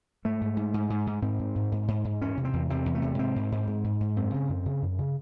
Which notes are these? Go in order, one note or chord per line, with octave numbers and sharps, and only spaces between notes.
G#2 A3
G#2
G#2
G#2
G#2
G#2
G#2 C4
G#2
G#2
G#2
G#2
G#2
E2 C#4
C3
C4
E2
C3 C4
E2
A3
C3
G#2 C4
G#2
G#2
G#2
G#2
G#2
F#2 C4
C#3
F#2
C#3
F#2
C#3